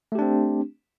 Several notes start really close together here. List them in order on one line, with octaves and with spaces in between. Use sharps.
A3 G4 D4 C4